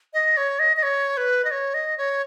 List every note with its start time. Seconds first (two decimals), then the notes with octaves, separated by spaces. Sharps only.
0.14 D#5
0.37 C#5
0.59 D#5
0.77 D#5
0.83 C#5
1.17 B4
1.45 D#5
1.51 C#5
1.74 D#5
1.98 C#5